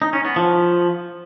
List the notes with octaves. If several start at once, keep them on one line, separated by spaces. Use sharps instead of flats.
D#4
C#4
B3
F3